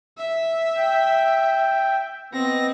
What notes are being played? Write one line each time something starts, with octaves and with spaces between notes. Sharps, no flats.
E5
G5
B3 C4 D#5 A#6